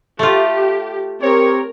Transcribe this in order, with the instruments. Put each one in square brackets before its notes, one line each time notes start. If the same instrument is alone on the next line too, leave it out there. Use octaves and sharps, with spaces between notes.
[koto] A3 F4 [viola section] G4
[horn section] C4 G4 C#5 [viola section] A#4